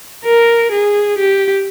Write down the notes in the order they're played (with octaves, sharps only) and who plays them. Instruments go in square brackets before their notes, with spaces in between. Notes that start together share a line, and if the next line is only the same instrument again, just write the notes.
[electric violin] A#4
G#4
G4